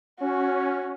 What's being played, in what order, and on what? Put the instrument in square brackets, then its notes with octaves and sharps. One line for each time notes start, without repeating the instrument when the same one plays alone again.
[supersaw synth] C#4 [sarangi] F#4